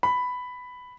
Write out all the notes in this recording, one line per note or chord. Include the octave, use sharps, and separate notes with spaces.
B5